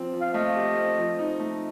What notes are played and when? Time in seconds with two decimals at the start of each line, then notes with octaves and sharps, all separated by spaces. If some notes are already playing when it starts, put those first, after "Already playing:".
Already playing: F3 C4
0.13 F3
0.21 F5
0.34 A3 D#5
0.56 G4
0.77 C4
0.98 F3
1.19 D#4
1.40 A3